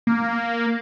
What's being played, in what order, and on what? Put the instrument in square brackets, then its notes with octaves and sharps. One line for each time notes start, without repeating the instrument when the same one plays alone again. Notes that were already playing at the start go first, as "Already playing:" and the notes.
[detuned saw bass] A#3